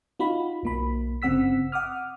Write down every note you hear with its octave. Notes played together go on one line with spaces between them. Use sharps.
D#4 F4 F#4 B5
B1 A#3 B5
G1 C#3 C4 F#5 E6 B6
F#5 D6 D#6 F6